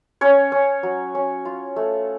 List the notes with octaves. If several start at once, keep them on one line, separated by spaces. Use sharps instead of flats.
C#4 C#5
C#4
F#3
C#4
F4
A3